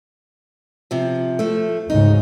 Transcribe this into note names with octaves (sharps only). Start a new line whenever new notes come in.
C3 F3
F3 A3
D2 G#2 C#3 D#4